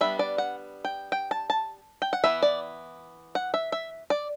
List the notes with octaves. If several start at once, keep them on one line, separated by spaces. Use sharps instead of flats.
G3 B3 D4 E5
D5
F#5
G5
G5
A5
A5
G5
F#5
E3 B3 E4 E5
D5
F#5
E5
E5
D5